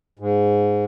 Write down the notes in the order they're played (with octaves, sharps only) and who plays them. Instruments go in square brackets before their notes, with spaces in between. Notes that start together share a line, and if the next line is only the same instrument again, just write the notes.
[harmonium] G#2